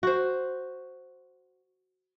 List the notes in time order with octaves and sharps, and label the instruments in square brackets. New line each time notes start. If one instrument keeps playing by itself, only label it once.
[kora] F#4 C5